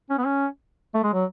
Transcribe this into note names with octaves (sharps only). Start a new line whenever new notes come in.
C#4
B3
C#4
A3
G#3
F#3